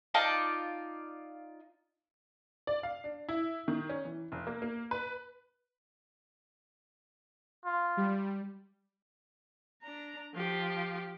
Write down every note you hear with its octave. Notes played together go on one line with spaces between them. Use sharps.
D#4 F4 D5 A5
D5
F5
D4
E4
D#3
C#4
E3
F1
A#3
A#3
B4
F4
G3
D4 A#5
F3 G4